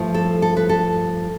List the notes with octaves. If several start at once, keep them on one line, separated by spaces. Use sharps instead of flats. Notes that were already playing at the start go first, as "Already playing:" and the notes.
Already playing: G2 F3 A3 E4
A4
A4
B4
A4